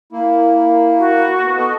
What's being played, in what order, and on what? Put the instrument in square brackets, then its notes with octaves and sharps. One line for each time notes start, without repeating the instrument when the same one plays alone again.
[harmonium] A#3 E4
[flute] F#4
[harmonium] B3
A4 D#5